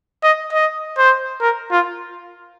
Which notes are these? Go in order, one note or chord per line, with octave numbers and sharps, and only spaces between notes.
D#5
D#5
C5
A#4
F4